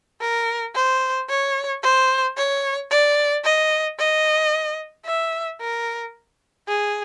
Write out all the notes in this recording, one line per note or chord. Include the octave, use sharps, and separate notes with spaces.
A#4
C5
C#5
C5
C#5
D5
D#5
D#5
E5
A#4
G#4